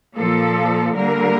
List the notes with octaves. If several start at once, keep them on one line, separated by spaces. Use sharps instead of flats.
A#2 F3 A#3 A4
D3 G3 A#3 A#4